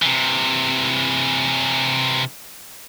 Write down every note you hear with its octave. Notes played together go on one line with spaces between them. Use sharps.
C3 E3